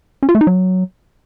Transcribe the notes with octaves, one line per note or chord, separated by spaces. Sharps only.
C#4
F4
A3
D#4
F#3